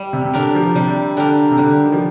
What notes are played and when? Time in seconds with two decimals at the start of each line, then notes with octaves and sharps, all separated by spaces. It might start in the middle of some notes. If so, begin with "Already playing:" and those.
Already playing: G3
0.13 C3
0.24 C3
0.34 D3 D4 G4 A#4
0.55 F3
0.75 C3 G3
1.16 D3 D4 G4 A#4
1.51 C3
1.58 D3 G3
1.85 D#3
1.92 F3